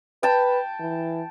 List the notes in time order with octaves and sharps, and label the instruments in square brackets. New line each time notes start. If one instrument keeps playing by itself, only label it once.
[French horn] B4 [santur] G5 A5
[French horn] E3